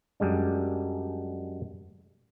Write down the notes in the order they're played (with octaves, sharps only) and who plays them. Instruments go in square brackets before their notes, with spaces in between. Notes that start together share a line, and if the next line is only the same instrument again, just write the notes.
[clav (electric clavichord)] F#2 G3 G#3 D4